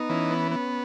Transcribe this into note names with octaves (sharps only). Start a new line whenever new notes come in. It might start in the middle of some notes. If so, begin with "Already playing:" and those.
Already playing: B3 D#4
E3 C#4
B3
B3